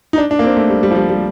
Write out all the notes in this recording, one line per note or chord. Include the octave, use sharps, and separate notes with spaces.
D#4
D4
D4
A#3
C4
A3
G3
G3
F3
G3
G3